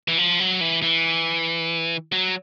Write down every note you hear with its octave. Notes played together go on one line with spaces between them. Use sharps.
E3
F3
F#3
E3
E3
F#3